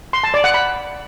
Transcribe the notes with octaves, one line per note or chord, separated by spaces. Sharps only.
C6
A5
D5
F#5
B5